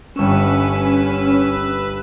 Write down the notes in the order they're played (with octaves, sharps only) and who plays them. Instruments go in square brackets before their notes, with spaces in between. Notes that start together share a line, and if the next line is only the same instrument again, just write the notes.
[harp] G1 C#6 E7 [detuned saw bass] C#4 [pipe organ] B4 E6